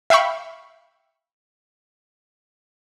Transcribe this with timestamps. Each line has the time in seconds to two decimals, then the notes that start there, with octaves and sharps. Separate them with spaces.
0.10 E5 F5 G5 B5 C#6